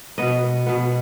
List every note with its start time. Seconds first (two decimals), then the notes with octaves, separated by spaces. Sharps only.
0.18 B2 B3 D#5
0.66 B2 B3